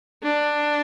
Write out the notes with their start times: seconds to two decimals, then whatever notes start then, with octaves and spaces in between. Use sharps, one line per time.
0.23 D4